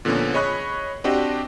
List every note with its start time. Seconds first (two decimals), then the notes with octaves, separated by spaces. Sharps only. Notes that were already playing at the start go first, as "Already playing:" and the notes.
0.05 A#2 D3 F3 A#3 B3 C#4
0.34 G#4 C#5 D#5 B5 C#6 F#6
1.04 C4 D4 F#4 G4 D#5